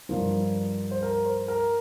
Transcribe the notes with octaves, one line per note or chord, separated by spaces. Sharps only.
G2 F3 A#4
C5
A#4
C5
A#4